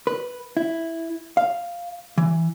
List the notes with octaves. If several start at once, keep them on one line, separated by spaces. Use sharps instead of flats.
B4
E4
F5
E3